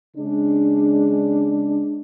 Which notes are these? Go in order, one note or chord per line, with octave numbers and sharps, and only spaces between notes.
C#3 G#3 D4